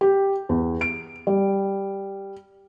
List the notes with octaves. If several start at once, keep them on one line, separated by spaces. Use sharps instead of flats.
G4
E2
D7
G3